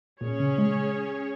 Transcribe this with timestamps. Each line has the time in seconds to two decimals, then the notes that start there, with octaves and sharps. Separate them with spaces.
0.21 A#2 C#4 G#4 C#5
0.40 C#3
0.58 G#3